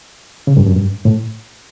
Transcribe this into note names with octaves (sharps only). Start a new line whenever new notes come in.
C#3
G2
F#2
G2
A2